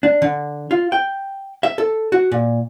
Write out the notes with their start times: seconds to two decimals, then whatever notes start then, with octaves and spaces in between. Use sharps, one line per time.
0.03 D4
0.22 D3
0.71 F4
0.92 G5
1.63 E5
1.78 A4
2.12 F#4
2.32 A#2